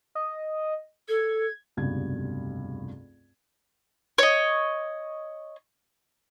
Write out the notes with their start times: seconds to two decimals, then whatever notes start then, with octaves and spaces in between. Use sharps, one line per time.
0.15 D#5
1.08 A4 G#6
1.77 F1 C#2 G2 B2 G#6
4.18 C#5 D#5